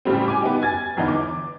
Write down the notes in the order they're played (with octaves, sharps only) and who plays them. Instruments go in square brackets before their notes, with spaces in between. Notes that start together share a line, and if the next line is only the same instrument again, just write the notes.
[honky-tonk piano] A2 C#3 G3 C4
G#5 D6
B3 D#4 G4
G#5 G#6 A6
G1 E2 B3 D#4
D6